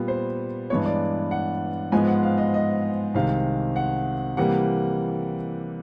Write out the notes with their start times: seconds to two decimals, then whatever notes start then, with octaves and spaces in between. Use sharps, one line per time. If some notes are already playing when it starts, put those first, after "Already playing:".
Already playing: A#2 G3 B3
0.08 C5
0.70 G2 E3 G#3 B3 C#5
0.86 D5
1.31 F#5
1.92 G#2 F3 G#3 B3 G#5
2.08 F#5
2.23 F5
2.38 D#5
2.54 D#5
3.14 C2 C3 D#3 G#3 F5
3.76 F#5
4.37 C3 E3 G3 A#3 F#5